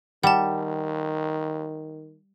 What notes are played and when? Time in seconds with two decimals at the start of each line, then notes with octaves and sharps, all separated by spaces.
0.24 D#3 G3 F#5 A5